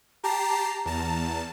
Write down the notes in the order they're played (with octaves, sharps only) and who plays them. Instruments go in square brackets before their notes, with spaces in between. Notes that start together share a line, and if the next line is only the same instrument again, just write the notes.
[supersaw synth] G4 A5 C7 [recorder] A#5
[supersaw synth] E2 A5 [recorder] A#5